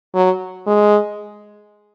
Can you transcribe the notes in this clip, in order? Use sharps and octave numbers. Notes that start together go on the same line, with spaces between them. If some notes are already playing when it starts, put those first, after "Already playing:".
F#3
G#3